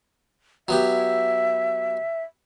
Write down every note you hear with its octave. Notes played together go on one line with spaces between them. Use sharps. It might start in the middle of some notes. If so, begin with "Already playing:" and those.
F#3 B3 G4 E5